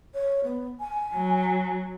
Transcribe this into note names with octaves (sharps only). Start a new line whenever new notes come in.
C#5
B3
G#5
F#3